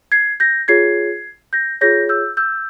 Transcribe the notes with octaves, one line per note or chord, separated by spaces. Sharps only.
G#6 C7
G6 A#6
F4 G#4 C#5 G#6 C7
G6 A#6
F4 G#4 C#5 G6 A#6
E6 G6
E6 G6